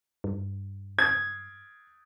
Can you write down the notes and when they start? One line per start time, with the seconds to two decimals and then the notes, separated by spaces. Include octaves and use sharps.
0.24 G2
0.99 G#6